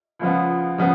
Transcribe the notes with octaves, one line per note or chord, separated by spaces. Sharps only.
C#2 C#3 F3 B3
C#3 F3 B3